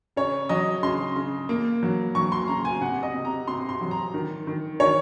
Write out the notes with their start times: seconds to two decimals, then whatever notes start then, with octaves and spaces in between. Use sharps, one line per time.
0.16 C#3 C#5
0.49 F#3 D#5
0.83 C#3 C6
1.16 C#3
1.49 A#3
1.83 F#3
2.15 F#3 C#6
2.32 C6
2.48 C#3 A#5
2.65 G#5
2.81 C3 F#5
3.03 D#5
3.14 C3
3.25 A#5
3.48 C3 C6
3.69 C6
3.81 F#3
3.91 A#5
4.14 D#3
4.47 D#3
4.80 D#3 C#5